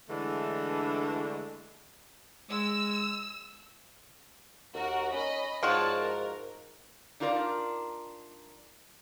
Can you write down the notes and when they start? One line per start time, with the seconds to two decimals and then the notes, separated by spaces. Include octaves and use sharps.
0.09 D3 E3 G#3 A3 D4
2.51 G#3 E6
4.74 D#2 F#4 A#4
5.13 C#4 D#5 B5
5.63 G#2 F3 F4 F#4 C#5 D5 A5
5.98 A#4
7.20 D4 D#4 F4 A#4 C#5 D5